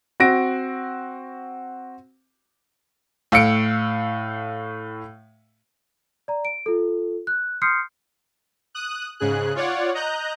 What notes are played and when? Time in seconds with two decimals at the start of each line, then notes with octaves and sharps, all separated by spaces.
0.20 C4 F#4 A#6 D7
3.32 A2 F5 E6 C#7 D7
6.28 D5 A#5
6.45 D7
6.66 F4 A4
7.27 F#6
7.62 C6 D#6 F6 G6 C7 C#7
8.74 D#6 F#6
9.20 G#2 C#3 G#4 F#6
9.55 F4 C#5 D5 F#5
9.94 D#5 A#5 F#6 G6